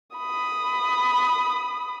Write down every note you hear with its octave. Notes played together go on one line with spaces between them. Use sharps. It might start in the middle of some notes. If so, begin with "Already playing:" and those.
B5 D#6